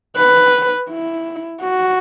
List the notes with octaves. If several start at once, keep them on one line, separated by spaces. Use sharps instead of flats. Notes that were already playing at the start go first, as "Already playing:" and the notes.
B4
E4
F#4